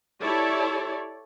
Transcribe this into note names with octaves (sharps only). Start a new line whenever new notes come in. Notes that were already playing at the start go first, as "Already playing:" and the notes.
E4 G4 A4 C#5 D5